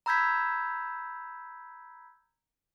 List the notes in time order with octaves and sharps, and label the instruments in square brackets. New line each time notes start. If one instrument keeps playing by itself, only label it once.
[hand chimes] A#5 B5 E6 G6 G#6 B6